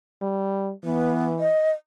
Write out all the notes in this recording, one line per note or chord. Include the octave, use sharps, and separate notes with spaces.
G3
E3 B3
D#5